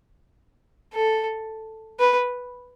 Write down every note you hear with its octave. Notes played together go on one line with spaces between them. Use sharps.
A4
B4